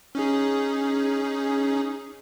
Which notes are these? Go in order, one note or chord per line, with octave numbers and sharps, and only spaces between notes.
C#4 D#4 G#4